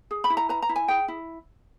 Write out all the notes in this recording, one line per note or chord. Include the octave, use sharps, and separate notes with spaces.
G#4
B5
E4
A#5
B4 A#5
A#5
E4
G#5
G#4 G5
E4